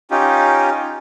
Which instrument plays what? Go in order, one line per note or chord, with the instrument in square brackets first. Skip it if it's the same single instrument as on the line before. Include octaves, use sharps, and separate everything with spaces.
[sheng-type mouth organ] C#4 D#4 F4 G4